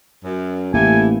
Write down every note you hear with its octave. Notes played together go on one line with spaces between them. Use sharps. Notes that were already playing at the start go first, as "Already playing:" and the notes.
F#2
A1 A3 A#3 E4 G4 G#5